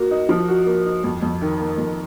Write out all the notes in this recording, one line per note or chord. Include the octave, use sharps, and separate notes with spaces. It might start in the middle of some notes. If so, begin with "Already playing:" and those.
Already playing: A#3 F#4
D#4
F3
F#4
A#3
D#4
F2
F2
D#3
A#3
F2